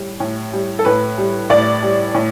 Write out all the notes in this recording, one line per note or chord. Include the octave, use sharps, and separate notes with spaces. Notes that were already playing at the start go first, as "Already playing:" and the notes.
Already playing: A2 G3
A2
G3
A4
A2 B4
G3
A2 D5
G3
A2